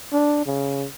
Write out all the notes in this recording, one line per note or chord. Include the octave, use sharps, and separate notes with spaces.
D4
C#3